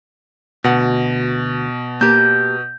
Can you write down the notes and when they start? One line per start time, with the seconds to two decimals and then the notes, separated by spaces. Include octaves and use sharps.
0.64 D2 B2 F#5
2.01 A#3 G4 G6